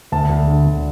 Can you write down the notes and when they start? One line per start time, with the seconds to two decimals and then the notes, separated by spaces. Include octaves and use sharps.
0.12 D2 A5
0.30 D2
0.47 D3
0.65 D2